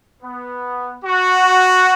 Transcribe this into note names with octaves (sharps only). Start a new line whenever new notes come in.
B3
F#4